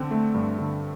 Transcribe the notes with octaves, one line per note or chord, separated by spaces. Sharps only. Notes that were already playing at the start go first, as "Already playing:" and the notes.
Already playing: D3 C4
A3
G2
D3